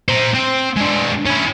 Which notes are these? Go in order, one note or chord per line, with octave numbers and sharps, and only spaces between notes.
C5 A#5
C4
G#3 D4
C#4 E4